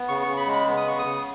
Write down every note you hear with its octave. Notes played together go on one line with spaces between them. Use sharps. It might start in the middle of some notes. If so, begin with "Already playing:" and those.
Already playing: B3
C#3 C#6
C#3 C#6
B5
G#3
B5
B3
D#6
C#3 C#6
D#6
C#3